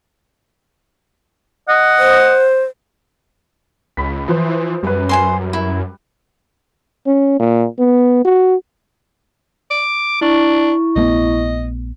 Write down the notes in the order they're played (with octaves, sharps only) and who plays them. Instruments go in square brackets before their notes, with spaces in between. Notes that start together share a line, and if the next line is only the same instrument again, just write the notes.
[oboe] D#5 [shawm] F#5
[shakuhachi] C5
[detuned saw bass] C#2 [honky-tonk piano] B5 B6
[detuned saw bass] E3 [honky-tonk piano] F3 B4 C5
[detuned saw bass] F#2 [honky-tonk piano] G3 B4
[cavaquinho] C5 G#5 C6
E4
[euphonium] C#4
A#2
B3
F#4
[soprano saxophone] D6
[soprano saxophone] D4 [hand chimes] E4 C#6
[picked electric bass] A#1 A3 B3 [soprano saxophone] D#5